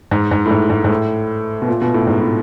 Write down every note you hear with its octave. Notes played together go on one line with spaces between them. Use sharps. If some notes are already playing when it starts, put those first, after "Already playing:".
G#2
G#2
A2
G#2
G#2
G#2
A2
B2
A#2
B2
A2
G#2
A2